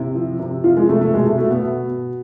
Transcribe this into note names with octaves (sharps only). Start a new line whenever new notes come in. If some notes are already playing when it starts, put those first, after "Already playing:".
Already playing: C3 E4
F3
C3
F3 F4
G#3
C3 A3
A3
B2 G#3
A3
B2 A3
B3
B2
B2